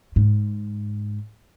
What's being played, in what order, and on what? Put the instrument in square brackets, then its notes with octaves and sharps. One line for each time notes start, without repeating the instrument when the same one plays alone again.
[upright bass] G#2